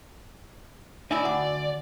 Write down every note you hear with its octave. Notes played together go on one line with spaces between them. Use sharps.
D#4 E4 D5 E5 G#5 E6
D2 F#5 D6